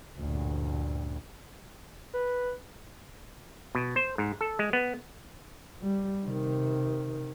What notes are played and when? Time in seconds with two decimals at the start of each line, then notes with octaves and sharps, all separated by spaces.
0.17 A1 D2 G2 A#2
2.14 B4
3.75 B2
3.96 C5
4.18 G#2
4.41 A4
4.59 G#3
4.73 B3
5.81 G3
6.24 C3 D#3